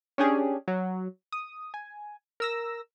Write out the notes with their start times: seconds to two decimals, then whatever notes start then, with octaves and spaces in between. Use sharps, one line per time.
0.18 C#4 D4 G4 G#4
0.68 F#3
1.32 D#6
1.74 G#5
2.40 A#4 E6 A#6